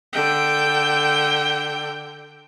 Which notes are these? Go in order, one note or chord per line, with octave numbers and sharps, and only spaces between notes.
D3 G5